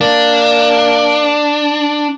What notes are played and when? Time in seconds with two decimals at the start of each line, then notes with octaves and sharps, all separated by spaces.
0.01 A#3 D4